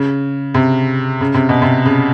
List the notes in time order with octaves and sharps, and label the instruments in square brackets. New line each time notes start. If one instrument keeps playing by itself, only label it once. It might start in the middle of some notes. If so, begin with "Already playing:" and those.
Already playing: [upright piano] C#3
C3
C#3
C3
B2
C3
C#3